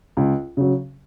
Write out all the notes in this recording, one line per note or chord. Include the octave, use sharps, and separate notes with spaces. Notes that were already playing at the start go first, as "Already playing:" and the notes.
C#2
C#3 F#3